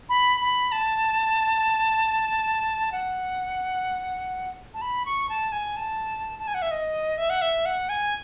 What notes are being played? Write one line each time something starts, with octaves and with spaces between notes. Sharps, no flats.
B5
B5
A5
F#5
A5
B5
C#6
A5
G#5
A5
A5
G#5
F#5
E5
D#5
E5
F#5
E5
F#5
G#5